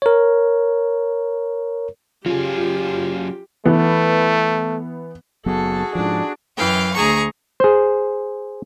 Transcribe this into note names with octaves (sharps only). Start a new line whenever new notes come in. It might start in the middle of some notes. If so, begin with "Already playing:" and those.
A#4 C#5
F#3 C#4 F4 G4 G#4
E3 A3 B3
F#1 F#3 B3 F#4 G#4 A4
G#2 F3 D4
F#2 E3 F5 G5
D2 G#4 A#5 C#6
G#4 C5